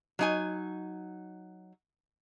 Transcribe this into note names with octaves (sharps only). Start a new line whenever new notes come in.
F#3 D#4 G#5